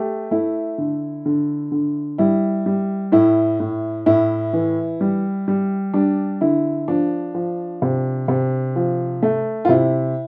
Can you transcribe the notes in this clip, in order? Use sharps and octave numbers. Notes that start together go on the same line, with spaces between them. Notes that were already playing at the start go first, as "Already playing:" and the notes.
Already playing: A3 G4
A3 E4
D3
D3
D3
G3 E4
G3
A2 E4
A2
A2 E4
E3
G3
G3
G3 D4
D3 E4
F3 D4
F3
C3
C3
F3
A3
F4
C3 E4